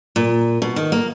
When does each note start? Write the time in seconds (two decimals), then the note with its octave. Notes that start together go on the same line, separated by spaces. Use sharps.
0.16 A#2
0.62 B2
0.76 D#3
0.92 A#3